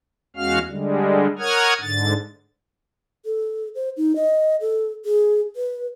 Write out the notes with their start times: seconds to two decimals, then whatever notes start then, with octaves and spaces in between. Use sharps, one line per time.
0.37 E2 G#3 C#4 F#4 F5 F6
0.69 D3 G3 G#3
1.39 A#4 C#5 F#5 D#6 F6 G#6
1.81 G#2 D3 A6
3.25 A4
3.75 C5
3.97 D#4
4.16 D#5
4.61 A4
5.05 G#4
5.56 B4